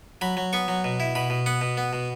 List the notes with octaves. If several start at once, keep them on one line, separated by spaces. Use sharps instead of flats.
F#3 B5
F#3
B3 C#6
F#3
B2
E4
B2 B5
B2
B3 F#5
B2
B3
B2